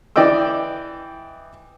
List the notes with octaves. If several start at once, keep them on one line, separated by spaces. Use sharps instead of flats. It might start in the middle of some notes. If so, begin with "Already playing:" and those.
E3 D5 D#5 G5 E6